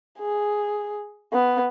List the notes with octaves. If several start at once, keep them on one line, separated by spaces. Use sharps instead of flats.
G#4
B3